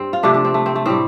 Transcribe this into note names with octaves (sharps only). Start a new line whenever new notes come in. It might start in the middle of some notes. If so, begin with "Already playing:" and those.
Already playing: G2 C4
F4
C3 F3 A3 D4
D4
C4
A3
C4
A3
A2 G3 C4